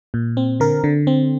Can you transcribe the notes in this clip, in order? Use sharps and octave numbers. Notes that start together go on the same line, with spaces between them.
A#2
C4
D3 A#4
D3
C4